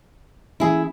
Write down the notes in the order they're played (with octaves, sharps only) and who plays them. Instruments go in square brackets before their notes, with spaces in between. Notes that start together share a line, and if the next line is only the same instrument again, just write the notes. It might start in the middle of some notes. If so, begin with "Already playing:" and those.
[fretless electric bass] E3 A#3 C#4 [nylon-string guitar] E4 G#4